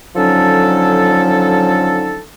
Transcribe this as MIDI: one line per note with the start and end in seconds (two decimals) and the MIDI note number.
0.16 2.20 50
0.16 2.20 53
0.16 2.20 54
0.16 2.20 61
0.16 2.20 63
0.16 2.20 69